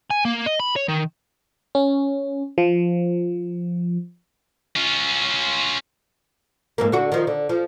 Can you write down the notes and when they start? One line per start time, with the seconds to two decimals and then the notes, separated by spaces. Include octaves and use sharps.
0.11 G#5
0.25 A#3
0.46 D#5
0.60 B5
0.76 C#5
0.89 D#3
1.75 C#4
2.58 F3
4.76 C#4 F4
6.78 G#2 F3 A#3
6.92 D3 F#4
7.12 D#3 F3
7.27 D3
7.49 F3